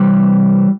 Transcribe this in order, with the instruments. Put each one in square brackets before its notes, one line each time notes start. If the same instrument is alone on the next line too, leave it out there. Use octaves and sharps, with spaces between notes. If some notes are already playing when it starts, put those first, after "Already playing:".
Already playing: [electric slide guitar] C3 E3 G3